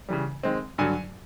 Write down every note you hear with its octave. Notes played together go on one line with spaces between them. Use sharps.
C#3 E3 G3
D#3 G#3 C4
G2 D3 F#3 G#5